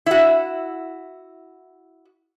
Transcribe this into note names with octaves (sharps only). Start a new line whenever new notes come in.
E4 F#4